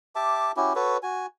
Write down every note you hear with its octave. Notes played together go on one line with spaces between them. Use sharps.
G4 E5 A5 D6
C#4 E4 F#4 G4
F#4 A4 B4 C#5
F#4 G#5